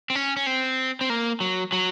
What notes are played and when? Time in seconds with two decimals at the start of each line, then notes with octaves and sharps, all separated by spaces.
0.10 C4
0.15 C#4
0.36 C#4
0.47 C4
1.01 C4
1.10 A#3
1.41 F#3
1.72 F#3